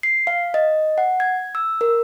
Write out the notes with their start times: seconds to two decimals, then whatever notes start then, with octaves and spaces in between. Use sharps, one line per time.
0.03 C7
0.27 F5
0.54 D#5
0.98 F#5
1.20 G#6
1.55 E6
1.81 A#4